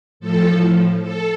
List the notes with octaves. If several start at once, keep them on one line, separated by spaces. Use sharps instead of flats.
A2 F3 A4
A4